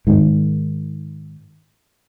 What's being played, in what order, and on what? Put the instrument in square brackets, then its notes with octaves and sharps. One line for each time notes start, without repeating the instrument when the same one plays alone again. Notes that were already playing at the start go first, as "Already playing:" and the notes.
[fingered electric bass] G#2 D#3